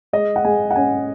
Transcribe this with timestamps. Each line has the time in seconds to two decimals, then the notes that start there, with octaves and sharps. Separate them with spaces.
0.13 G#3 D#5
0.36 F#5
0.45 G#3 G#5
0.71 F#5
0.76 C#4 G#5